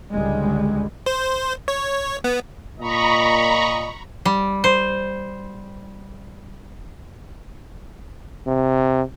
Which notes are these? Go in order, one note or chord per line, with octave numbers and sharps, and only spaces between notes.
C#2 G#2 D3 G3 G#3
C5
C#5
B3
A#2 D#5 A#5 B5 C#6
G3
C5
C3